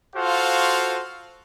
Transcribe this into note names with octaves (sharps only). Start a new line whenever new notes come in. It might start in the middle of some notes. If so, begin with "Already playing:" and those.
F4 F#4 A4 C5 F5